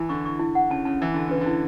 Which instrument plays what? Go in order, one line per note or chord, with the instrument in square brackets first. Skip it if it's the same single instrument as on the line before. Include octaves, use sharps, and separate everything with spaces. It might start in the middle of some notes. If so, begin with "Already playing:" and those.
Already playing: [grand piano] E3 [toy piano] E4
[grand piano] D3 [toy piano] C#6
[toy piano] C#6
E4
F#5
[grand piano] C#3 [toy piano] A5
[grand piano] C#3 [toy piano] A5
[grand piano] E3 [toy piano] E4
[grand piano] D3 [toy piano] A5
[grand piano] C#3 [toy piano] B4
[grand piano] D3
[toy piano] E4